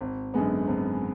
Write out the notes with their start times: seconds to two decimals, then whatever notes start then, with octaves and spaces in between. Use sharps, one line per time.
0.01 G#1
0.34 F#2 D3 G#3 B3
0.67 G#1